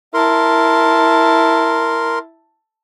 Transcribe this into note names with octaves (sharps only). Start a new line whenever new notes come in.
E4 A#4 A5 C6